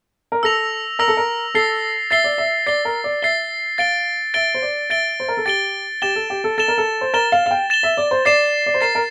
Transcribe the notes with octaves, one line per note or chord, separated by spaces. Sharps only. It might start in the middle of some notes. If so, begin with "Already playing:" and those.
A#4
A4 E6 A#6 F7
A#4 E6 A#6 F7
A4
A#4
A4 A6 C7 G7
E5 A6 C7 G7
D5
E5
D5 A6 C7 G7
A#4
D5
E5 A6 C7 G7
F5 A6 D7 G7
E5 A6 D7 G7
C5
D5
E5 A6 D7 G7
C5
A#4
A4
G4 A6 D7 G7
G4 A6 E7 G7
A4
G4
A4
A4 A6 E7 G7
A#4
A4
C5
A#4 A6 E7 G7
F5
F5
G5
A6 E7 G7
E5
D5
C5
D5 A6 C7 E7
D5
C5
A#4 A6 C7 E7
A#4